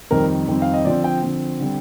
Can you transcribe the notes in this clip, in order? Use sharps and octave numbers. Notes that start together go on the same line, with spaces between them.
F2 D#3 G3 C4 A#4
F2 D#3 G3 C4
F5
D#5
D3 F3 C4 D5
G5
D3 F3 C4
D3 G3 C4